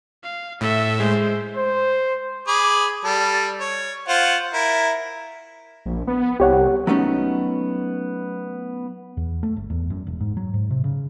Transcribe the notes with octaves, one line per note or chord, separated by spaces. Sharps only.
F5
A2 A4 E5
G#3 C5
C5
G#4 B5 D6
G3 A4
C#5
F4 C5 F#5
E4 A#4
A#1
B3
C2 G4 C#5 F#5
F#3 A3 B3 C#4 D#4
E2
A3
G1
E2
F#2
E1
G#2
F#3
G#2
C3
C#3